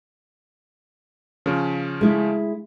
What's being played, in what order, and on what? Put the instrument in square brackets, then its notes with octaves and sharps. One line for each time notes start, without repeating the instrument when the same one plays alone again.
[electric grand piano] C#3 F3 C#4
[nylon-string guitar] G#3 E4